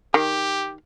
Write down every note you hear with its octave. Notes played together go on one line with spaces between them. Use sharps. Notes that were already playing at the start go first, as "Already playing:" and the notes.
D#3 G4